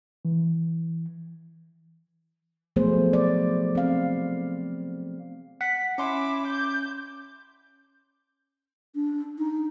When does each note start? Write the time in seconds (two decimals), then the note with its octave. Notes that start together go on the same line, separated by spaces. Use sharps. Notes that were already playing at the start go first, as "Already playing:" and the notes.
0.25 E3
2.76 F3 F#3 A3 B3 G#4 C5
3.13 D5
3.75 C4 F5
5.61 F#5 B6
5.98 C#4 E4 C6 D6
6.47 G6
8.95 D4
9.38 D#4